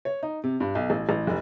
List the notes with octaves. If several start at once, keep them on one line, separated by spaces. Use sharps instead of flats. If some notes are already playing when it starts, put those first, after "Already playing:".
C#5
D#4
C3
G2
B1
A1
A1
F1